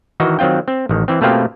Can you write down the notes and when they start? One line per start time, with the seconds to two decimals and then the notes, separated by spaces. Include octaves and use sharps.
0.20 D#3 E3 D#4 F#4
0.39 D#3 F#3 C4 F4 G5
0.68 C4
0.89 A1 D#3
1.08 E3 C4
1.21 B2 A3 A#3 C4 F4 G4